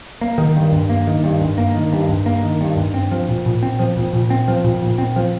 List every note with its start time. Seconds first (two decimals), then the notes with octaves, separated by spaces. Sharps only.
0.21 A#3
0.38 D#3
0.56 G2
0.73 G2
0.90 A#3
1.07 D#3
1.24 G2
1.41 G2
1.58 A#3
1.74 D#3
1.93 G2
2.09 G2
2.26 A#3
2.43 D#3
2.61 G2
2.77 G2
2.94 C4
3.11 F3
3.28 A#2
3.46 A#2
3.63 C4
3.79 F3
3.97 A#2
4.13 A#2
4.30 C4
4.48 F3
4.64 A#2
4.82 A#2
4.98 C4
5.16 F3